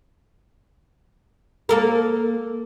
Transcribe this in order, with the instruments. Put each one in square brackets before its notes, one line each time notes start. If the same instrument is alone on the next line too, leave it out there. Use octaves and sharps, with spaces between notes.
[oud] A#3 A4 A#4